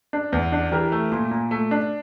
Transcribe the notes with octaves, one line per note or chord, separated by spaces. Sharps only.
D4
E2
D4
E3 G4 A#4
A3
A#2
A#2
A3
D4